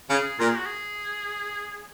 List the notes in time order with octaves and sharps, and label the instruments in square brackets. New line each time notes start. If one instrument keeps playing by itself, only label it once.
[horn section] C#3 [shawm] G#4
[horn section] A#2 [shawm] A#4
[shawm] G#4
F#4
G#4